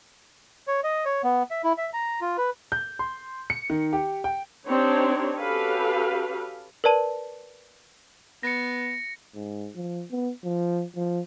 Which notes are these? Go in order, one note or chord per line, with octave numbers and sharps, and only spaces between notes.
C#5
D#5
C#5
B3
E5
E4
E5
A#5
F4
B4
G6
C6
C#7
D#3
G4
G5
C4 D4 D#4 G4 C#5
C#4 F#4 G4 A4 B4 F5
A#4 B4 D5 A5 D#7
B3 A#6 C#7
G#2
F3
B3
F3
F3